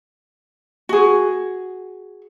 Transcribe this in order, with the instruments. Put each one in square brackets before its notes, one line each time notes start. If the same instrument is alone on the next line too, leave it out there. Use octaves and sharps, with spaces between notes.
[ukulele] F#4 G#4